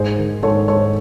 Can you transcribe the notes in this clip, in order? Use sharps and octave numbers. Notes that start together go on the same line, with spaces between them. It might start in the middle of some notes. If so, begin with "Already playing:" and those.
Already playing: G#2 G#4 C5
D#3
G#2 A4 C#5
G#2 A4 C#5